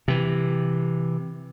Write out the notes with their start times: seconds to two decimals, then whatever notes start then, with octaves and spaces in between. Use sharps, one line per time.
0.08 C3 E3